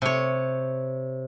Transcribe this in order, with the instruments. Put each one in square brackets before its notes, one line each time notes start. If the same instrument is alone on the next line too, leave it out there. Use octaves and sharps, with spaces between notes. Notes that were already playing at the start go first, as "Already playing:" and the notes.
[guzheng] C3 C#5